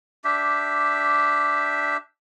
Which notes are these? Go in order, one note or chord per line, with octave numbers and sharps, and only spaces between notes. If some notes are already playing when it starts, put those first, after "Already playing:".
D4 G4 E5